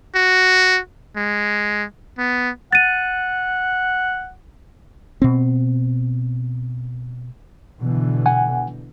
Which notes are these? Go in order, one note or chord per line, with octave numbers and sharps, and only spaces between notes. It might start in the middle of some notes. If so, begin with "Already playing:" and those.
F#4
G#3
B3
F#5 A6 D#7
B2 C4
B2 D3 E3
F#5 G#5